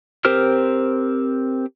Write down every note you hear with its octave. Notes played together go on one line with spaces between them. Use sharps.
C4 G4 A#4 C5 F6